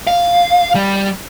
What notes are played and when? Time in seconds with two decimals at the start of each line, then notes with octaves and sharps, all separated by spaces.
0.07 F5
0.75 G3